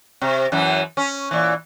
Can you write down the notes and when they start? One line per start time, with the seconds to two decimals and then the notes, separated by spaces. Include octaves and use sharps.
0.21 C3
0.52 F#2 E3
0.97 C#4
1.31 A#2 E3